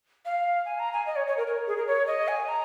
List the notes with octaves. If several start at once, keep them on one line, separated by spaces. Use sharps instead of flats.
F5
G#5
A#5
G#5
D#5
C#5
C#5
A#4
A#4
G#4
A#4
C#5
D#5
G#5
A#5